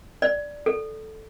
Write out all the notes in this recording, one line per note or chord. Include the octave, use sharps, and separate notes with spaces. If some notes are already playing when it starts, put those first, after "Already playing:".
D5
A4